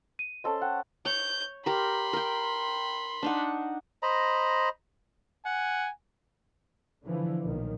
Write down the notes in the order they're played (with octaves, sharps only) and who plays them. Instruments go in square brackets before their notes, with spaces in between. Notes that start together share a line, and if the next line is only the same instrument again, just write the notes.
[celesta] D#7
[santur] C#4 A4 C5 [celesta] D#5 A5
[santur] F#5 [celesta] G5
[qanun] C#5 [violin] G6
[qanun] G4 A#4 [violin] B5 C6
[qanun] A#4 G5
D4 D#4 F#5
[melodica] C5 D#5 A#5 B5
[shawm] F#5 [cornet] G#5
[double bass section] D3 E3 F3
B1 A#2 D#3